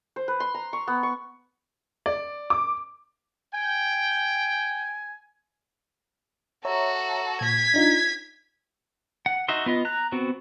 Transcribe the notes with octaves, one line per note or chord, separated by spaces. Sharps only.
C5
B4
C6
A#5
C#6
B3
C#6
D5
D6
G5 G#5
F#4 A4 C#5 E5 A#5
A#2 G#6 B6
D4 D#4 F4
F#5
D#4 F#4 D#5 E5 C6
B3 F4 D#5
A#5 F#6
B3 C4 F#4